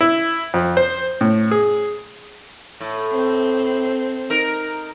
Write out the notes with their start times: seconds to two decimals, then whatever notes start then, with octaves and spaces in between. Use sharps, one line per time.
0.01 E4
0.54 F2
0.77 C5
1.21 A2
1.51 G#4
2.80 A2
3.13 C4
4.30 D#4 A#4